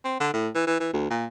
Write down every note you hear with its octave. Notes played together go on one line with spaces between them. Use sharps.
C4
D3
A2
E3
E3
E3
D2
A#2